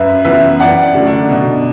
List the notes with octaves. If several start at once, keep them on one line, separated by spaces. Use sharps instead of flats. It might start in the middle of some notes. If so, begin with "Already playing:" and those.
Already playing: F#2 B4 E5
E3 B3 B4 E5
F#2 D5 F#5
D3 A3
D4
B2